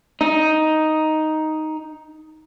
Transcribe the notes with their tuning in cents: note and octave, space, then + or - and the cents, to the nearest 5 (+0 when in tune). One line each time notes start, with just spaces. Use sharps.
D#4 +5